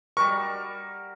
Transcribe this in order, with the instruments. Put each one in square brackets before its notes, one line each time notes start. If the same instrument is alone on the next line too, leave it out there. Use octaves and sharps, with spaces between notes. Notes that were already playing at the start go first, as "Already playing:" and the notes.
[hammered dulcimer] G3 F#4 A#4 [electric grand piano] C#6